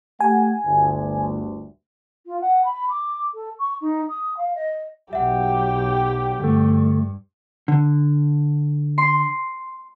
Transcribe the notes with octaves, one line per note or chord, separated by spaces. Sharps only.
A3 G4 F#5 G#5
G1 D2
F4
F#5
B5
D6
A4
C#6
D#4
D#6
F5
D#5
B1 F#3 G4 E5 F#5 G5
D2 G2 A3
D3
C6